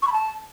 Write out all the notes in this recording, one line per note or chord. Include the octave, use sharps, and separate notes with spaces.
C#6
B5
A5